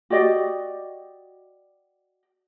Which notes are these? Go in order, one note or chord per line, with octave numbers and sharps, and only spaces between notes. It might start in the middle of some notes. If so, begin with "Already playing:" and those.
F#4 G4 D5 D#5